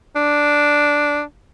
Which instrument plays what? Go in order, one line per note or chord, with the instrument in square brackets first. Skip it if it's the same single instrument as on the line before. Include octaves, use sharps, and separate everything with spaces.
[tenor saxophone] D4